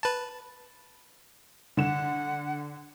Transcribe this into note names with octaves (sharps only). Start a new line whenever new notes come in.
B4 A5
D3 F#5 E7